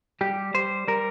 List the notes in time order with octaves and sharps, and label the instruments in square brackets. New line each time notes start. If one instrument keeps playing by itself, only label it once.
[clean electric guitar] G3 G4
G3 C5
G3 A#4